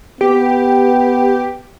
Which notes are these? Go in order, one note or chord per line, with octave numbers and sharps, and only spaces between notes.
B3 G4